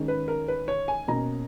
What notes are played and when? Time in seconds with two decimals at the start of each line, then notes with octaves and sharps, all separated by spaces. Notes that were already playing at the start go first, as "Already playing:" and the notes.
Already playing: D#3 G#3 C#4
0.08 B4
0.28 A#4
0.48 B4
0.68 C#5
0.88 G#5
1.08 B2 A#3 C#4 A#5